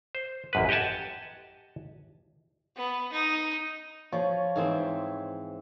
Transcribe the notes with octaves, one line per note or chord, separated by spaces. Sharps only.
C5
A1 F#2 B4
G4 D#5 F#5 G#5 A5
B3
D#4
F3 C#5
G#2 E3 C4